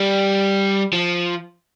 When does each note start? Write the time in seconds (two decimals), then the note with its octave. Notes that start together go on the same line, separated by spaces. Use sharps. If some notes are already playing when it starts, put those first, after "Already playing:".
Already playing: G3
0.93 F3